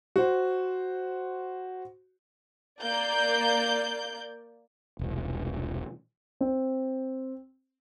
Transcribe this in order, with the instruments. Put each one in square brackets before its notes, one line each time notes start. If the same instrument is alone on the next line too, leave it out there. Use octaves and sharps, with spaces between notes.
[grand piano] F#4 C5
[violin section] A#3 D5 G6
[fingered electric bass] E1 C2
[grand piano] C4